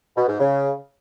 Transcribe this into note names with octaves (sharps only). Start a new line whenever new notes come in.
B2
G#2
C#3